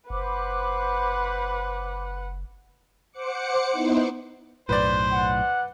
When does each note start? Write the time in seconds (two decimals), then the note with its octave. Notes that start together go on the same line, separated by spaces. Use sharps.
0.10 F#1 B4 C5 F#5 B5 D6
3.12 C5 F#5 D6 C#7
3.71 B3 D#4 E4 C5
4.69 B1 F#2 A2 B4 C5 D5
5.13 F#5